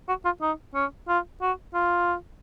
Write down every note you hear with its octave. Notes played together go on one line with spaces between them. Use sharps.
F#4
F4
D#4
C#4
F4
F#4
F4